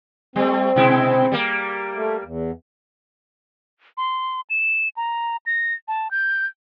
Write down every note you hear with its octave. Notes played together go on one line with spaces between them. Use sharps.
G3 A3 C4
B2 G#3 E4
G3 A#3
A3
E2
C6
E7
A#5
A#6
A5
G6